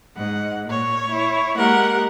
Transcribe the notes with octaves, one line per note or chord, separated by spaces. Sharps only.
G#2 F#5
A#2 C#5
E4
G#3 A#3 G4 A#4 F#5